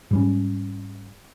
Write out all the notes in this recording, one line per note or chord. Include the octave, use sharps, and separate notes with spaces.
G#2 G3 C#4